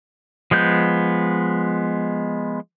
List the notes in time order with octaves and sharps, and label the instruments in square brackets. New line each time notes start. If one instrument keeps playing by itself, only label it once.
[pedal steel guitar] F3 G#3 B3 G6